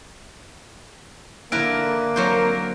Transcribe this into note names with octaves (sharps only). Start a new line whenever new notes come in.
D3 A#3 E4 A#4 B4 D7
D3 F#3 C4 A#4 C5